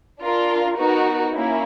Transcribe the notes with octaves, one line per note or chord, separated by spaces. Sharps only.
D4 F4 A#4
B3 D#4 F#4 A#4
A#3 C#4 E4